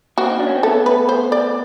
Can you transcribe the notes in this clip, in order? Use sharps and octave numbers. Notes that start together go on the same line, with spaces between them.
A#3 C4 F#4
D#4
D4
C#4
C4
A3 B3 A4
B4
C5
D5